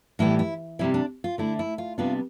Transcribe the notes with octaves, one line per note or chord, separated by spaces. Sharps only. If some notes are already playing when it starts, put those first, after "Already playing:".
A2 E3 G3 B3 E4
E4
C3 G3 C4 E4
D4
F4
D3 A3 D4 E4
E4
F4
C3 G3 B3 D4 F4